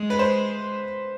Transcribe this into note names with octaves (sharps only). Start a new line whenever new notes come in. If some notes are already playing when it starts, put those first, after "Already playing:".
Already playing: G#3
B4
C5